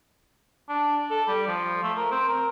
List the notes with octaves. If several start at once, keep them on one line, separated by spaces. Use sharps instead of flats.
D4
A4
G3
F3
A3
A#4
C4
A#4